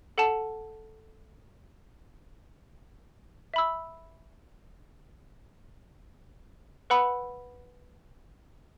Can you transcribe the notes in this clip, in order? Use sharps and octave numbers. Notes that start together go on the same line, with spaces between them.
A4 F#5 A5
E5 B5 E6
B4 F#5 B5 E6